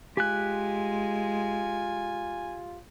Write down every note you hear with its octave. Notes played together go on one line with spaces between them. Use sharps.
G#3 F4 G4 G#5 F#6